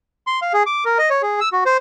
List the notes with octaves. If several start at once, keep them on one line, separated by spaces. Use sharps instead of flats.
C6
F5
G#4
D6
A#4
D#5
C#5
G#4
E6
F#4
C5